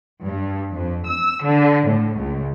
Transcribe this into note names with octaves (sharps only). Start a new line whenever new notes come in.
G2
F2
E6
D3
A2
C#2